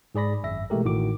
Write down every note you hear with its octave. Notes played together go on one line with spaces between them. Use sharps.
G#2 G#4 D5 B5 A#6
G#1 F#2 E5 A#6
B2 E3 G#3 A3 G4 A#4
A1 A2 D#3 F#4 D6